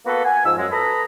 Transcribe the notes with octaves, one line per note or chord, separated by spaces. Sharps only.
A#3 B3 F#4 A4 B4
F#5 G#5
G#2 F3 E6
F#2 G#3
A4 B4 D#5 A#5 B5